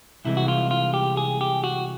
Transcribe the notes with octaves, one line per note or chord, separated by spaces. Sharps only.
C2 C3 E3 G#3 E4
F#4
F4
F4
G4
G#4
G4
F#4